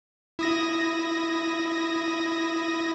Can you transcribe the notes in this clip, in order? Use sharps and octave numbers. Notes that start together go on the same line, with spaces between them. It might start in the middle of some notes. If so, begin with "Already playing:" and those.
E4 D#6 A#6